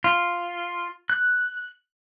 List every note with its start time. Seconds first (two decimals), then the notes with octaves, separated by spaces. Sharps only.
0.04 F4
1.10 F#6